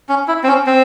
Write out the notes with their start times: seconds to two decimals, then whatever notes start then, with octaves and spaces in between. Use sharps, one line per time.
0.09 C#4
0.28 E4
0.44 C4
0.48 C#4
0.66 C4